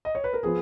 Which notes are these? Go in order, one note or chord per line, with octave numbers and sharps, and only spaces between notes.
D#5
C#5
B4
A#4
F3 B3 G#4